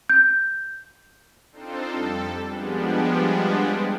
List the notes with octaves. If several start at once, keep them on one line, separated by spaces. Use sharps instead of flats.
G6
C4 D4 D#4 F4 A4 C5
F2 G3 A4
F3 G3 G#3 B3 D4